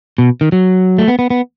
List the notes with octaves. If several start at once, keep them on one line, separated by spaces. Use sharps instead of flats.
B2
D#3
F#3
A3
B3
B3
B3